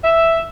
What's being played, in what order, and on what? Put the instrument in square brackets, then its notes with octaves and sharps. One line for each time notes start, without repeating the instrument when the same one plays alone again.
[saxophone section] E5